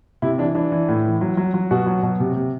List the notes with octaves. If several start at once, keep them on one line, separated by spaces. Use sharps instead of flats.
C3 E4
E3 D4
E3 D4
E3
A2
E3
F#3
F#3
F#3
B2 F#4
F#3
B2
C3
C3